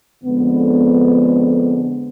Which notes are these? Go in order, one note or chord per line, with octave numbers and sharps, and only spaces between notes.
F2 D3 G#3 B3